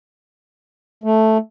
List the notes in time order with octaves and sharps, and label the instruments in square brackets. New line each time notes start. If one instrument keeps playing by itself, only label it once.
[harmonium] A3